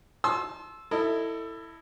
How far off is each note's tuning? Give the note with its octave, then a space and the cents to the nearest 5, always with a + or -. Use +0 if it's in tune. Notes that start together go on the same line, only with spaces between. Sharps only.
A5 -35 C6 +15 E6 +0
E4 +0 A4 +25 D#5 -10